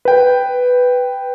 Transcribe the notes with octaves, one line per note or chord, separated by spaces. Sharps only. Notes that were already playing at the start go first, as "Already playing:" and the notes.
B4 G5